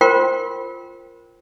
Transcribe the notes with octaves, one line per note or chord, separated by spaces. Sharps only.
F4 A#4 C5 G5 C6